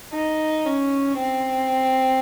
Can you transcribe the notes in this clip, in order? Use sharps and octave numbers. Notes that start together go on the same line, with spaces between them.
D#4
C#4
C4